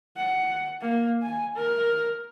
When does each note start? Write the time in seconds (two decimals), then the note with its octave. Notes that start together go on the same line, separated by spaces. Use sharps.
0.16 F#5
0.81 A#3
1.23 G#5
1.55 A#4